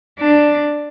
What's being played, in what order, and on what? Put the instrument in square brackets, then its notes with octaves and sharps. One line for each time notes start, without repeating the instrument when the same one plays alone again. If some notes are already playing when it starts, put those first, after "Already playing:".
[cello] D4